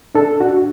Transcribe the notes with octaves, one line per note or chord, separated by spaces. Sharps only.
D4 A4
D4 F#4